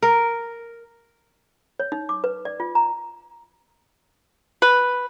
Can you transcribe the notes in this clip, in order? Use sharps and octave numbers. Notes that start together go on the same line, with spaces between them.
A#4
C#5
D#4
D6
B4
D5
F4
A#5
B4